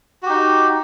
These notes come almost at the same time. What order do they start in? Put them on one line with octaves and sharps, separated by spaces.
F#4 G4 D#4